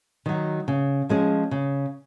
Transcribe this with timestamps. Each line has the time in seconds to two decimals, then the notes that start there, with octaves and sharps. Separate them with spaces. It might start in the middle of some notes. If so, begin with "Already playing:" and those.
0.26 D#3 F#3
0.68 C#3
1.09 F3 G#3 C#4 G#4
1.51 C#3